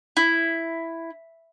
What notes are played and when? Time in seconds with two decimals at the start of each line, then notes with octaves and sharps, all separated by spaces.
0.17 E4